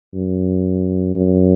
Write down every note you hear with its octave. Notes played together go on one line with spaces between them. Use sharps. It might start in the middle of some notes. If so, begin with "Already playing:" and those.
F#2
F#2